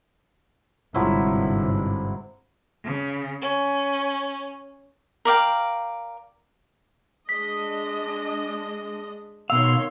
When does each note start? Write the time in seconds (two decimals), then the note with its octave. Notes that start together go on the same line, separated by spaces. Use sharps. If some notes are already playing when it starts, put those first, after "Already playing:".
0.95 G1 G#2 C3 F3 F#3 E4
2.83 C#3
3.41 C#4
5.25 A#4 D5 F5 G5
7.29 G#3 D4 D#5 B6
9.50 B2 D#3 C#5 F5 C6 E6